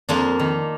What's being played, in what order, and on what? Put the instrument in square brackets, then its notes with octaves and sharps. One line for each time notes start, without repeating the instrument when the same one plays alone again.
[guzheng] F2 A#3 D4
D#3